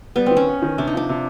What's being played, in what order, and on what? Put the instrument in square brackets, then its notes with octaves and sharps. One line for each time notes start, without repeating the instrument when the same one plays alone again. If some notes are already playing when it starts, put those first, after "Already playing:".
[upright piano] G3 [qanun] B3
[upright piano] D#3 [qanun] C4
[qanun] C#4
[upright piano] B3
D#3
[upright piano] C3 [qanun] D4
[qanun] D#4
[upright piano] F3 [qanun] D4
[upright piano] C3